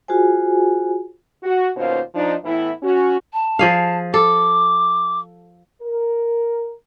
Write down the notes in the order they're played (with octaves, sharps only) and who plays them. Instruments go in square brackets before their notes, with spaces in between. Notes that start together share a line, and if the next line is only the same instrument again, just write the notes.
[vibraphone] F4 F#4 G#4 C5 G#5
[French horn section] F#4
D#2 B2 A#3 C#4 F4 C5
F3 D4 D#4
A2 E3 B3 E4
C#4 F#4
[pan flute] A5
[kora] F3 G#4 F5
[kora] A4 [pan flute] D6
[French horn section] A#4